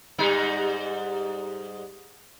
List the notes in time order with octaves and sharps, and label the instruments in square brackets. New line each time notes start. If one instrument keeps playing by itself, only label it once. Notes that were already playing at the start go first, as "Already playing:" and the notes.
[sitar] G#2 G3 D#4